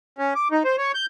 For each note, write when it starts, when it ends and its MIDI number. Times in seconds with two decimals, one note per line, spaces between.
0.18 0.34 61
0.35 0.48 86
0.52 0.63 63
0.65 0.76 72
0.78 0.92 73
0.94 1.06 91